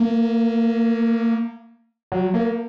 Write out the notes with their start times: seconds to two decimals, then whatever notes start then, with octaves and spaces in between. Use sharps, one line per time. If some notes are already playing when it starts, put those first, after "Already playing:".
Already playing: A#3
2.12 F#3
2.34 A#3